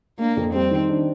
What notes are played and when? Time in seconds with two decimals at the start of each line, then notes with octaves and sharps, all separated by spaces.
0.19 A#3 D4
0.37 F2
0.54 G3 C4
0.71 D#3
0.89 D4